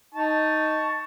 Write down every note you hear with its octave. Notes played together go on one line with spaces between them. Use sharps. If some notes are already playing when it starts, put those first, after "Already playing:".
D#4 A5 C#6